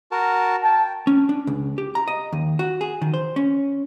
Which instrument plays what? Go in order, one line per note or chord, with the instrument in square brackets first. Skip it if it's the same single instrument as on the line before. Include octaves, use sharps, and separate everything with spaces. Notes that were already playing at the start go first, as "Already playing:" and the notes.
[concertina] F#4 A#4 A5
[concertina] G5 [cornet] A5
[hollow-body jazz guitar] C#4
D4
C#2
G4
A#5
D#5
D#2
F#4
G#4
D#3
C5
C#4